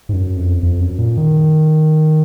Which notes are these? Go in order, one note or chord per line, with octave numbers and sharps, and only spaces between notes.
G#2
F#2
F2
F2
F#2
A#2
D#3